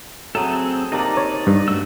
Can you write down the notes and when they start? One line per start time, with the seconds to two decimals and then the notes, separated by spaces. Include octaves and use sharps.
0.35 F#3 A3 C4 G#4 A4
0.92 C3 A#3 D4 D#4 D5
1.17 C#5
1.47 G2
1.68 A3 F#4 E6